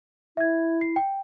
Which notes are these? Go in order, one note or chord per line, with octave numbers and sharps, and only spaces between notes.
E4 E5 G#6
C7
G5